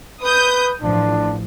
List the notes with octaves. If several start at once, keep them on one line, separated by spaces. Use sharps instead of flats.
B4 D#6 G6
A1 F3 D4